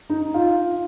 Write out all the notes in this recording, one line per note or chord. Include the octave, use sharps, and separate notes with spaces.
D#4
F4